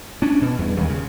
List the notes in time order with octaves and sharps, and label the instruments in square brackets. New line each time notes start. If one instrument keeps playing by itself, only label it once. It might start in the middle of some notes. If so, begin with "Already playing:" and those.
[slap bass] C#4 D4
B2
E2 G2
D#2 G#3
C#3